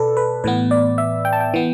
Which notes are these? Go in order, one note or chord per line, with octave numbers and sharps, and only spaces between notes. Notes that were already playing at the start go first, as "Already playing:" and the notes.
Already playing: B2 A4 B4 D5
B4
A2 E3 B3 B4
D5
E5
G5
A5
G5
E3 B3